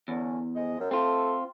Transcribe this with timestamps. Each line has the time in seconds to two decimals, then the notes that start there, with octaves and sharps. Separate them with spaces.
0.08 E2 D3 C#4
0.56 F2 G#3 D#5
0.79 F#2
0.91 A3 C4 F4 A4